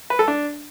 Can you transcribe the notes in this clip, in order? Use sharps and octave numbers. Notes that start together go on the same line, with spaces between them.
B4
A4
D4